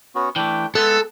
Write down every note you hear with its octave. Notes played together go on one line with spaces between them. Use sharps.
B3 C#4 F#4
E3 A3 D4 G5
G#3 B3 A4 E5